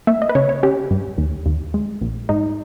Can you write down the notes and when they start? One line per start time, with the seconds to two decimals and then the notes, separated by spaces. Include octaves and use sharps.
0.07 A#3 E5
0.22 D#5
0.29 B4
0.35 C#3 C#5
0.49 C#5
0.63 C#4 G4
0.91 G2
1.18 D#2
1.46 D#2
1.74 G#3
2.02 A#1
2.29 G#2 D#4